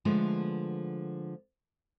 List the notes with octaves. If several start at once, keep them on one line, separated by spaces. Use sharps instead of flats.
D3 F3 G#3 A3 B3